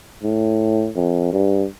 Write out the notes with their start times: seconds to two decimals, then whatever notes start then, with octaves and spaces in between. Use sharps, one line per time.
0.24 A2
0.96 F2
1.33 G2